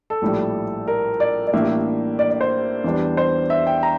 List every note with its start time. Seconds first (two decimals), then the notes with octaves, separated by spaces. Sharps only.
0.10 A4
0.22 A#1 A2 G3
0.88 A#4
1.20 D5
1.47 D5
1.53 A1 A2 G3 A#3 D4 E5
2.19 D5
2.30 D5
2.41 C5
2.84 E2 E3 G3 D4
3.17 C5
3.50 E5
3.67 G5
3.83 A#5